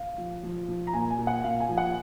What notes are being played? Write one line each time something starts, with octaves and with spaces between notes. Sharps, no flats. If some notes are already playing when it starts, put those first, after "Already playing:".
Already playing: F5
F3
F3
F3
A#5
A#2 G#5
G#5
A#2
F#5
A#2 F5
G#5
F3
F#5